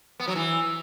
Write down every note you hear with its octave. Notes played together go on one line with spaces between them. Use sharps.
B3
F#3
E3